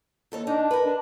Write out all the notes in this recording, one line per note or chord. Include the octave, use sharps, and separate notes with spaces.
D#2 A4 C#5
D4 D#4
A#4 B4
D4